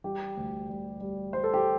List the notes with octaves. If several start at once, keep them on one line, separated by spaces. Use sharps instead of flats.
G3 G4
D2
G3
G3
G3 C5
A4
G4